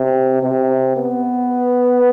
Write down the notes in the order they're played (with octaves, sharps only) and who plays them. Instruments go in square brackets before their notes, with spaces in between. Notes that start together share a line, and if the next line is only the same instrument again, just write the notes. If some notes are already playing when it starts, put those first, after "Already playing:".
Already playing: [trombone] C3
C3
B3